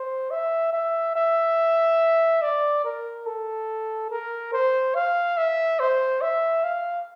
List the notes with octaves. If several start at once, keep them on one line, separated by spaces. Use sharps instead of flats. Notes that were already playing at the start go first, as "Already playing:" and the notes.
Already playing: C5
E5
E5
E5
D5
A#4
A4
A#4
C5
F5
E5
C5
E5
F5